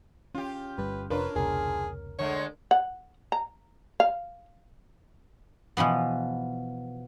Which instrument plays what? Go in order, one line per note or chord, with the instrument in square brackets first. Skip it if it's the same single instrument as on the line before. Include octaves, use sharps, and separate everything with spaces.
[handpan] C#4 [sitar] F4 G4
[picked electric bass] G1 G3 [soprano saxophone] B4
[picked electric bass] F1 [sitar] D4 F4 [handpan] A#4 C#5 [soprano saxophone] B4
[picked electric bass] F1 C#2 B2 [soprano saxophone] G#4 [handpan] A#4
[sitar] D3 G#3 A3 [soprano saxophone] C#5
[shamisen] F#5
A#5
F5
[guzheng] B2 E3 F3 B3